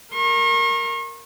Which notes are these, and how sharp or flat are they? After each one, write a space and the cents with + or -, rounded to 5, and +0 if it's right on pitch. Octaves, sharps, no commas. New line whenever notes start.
A#4 -5 C#6 -45